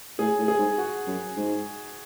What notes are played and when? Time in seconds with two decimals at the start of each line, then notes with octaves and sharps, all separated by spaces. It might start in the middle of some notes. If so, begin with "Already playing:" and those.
0.19 A2 G#4
0.39 A2
0.48 G#4
0.58 G#2
0.78 F#4
1.07 F#2
1.37 G#2